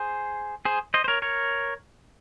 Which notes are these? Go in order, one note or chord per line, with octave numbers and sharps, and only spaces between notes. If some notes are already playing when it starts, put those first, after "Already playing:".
Already playing: G#4 C5
G#4 C5
C5 D#5
C5
A#4 C#5
A#4 C#5